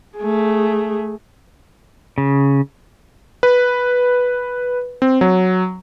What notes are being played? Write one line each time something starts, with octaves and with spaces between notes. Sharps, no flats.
A3 G#4
C#3
B4
C4
F#3